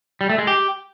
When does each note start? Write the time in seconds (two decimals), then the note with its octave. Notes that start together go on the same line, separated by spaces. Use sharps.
0.21 G3
0.30 A3
0.38 G#3
0.47 G4